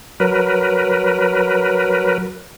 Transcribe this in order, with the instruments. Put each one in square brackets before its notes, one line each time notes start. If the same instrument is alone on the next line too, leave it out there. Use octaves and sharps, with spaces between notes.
[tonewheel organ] F#3 A#4 B4